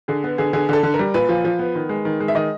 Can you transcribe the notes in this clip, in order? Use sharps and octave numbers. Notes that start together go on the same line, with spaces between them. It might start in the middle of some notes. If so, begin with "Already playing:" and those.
D3 G#4
B3
D3 G#4
D3 G#4
D3 A4
D3
A#4
G3
A#2 B4
F3
F3
B3
D#3
G#3
D#3
G#3
E5
D#3 D#5